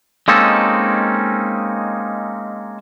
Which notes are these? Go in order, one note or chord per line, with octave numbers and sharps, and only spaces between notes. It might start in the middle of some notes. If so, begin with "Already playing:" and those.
G#3 A#3 C4 C#4 D#4 A4